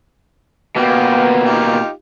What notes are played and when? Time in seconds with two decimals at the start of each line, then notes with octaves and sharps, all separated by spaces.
0.76 B2 A#3 B3 G4 G5
1.43 D#4 F4 G4